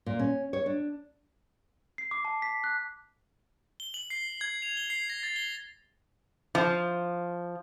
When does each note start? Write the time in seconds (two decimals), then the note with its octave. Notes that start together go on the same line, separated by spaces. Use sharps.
0.06 A#2
0.19 C#4
0.53 C#5
0.66 D4
1.98 C7
2.11 D6
2.25 A5
2.42 B6
2.64 F#6
3.80 G7
3.94 F#7
4.10 C7
4.41 G#6
4.62 F7
4.77 G7
4.90 C7
5.10 A#6
5.23 A6
5.36 G7
6.55 F3